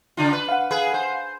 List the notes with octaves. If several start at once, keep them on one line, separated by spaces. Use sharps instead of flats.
C#3 D4 F4
B4
F5 F#5
G#4 B4
C5